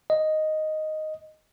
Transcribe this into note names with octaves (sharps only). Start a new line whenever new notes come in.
D#5